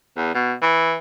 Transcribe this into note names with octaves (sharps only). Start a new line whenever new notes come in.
E2
B2
E3